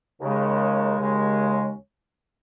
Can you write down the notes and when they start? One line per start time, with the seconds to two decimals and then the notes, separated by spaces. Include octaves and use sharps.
0.21 D#2 C#3 G#3 C#4
0.98 D#2 C#3 G#3 C#4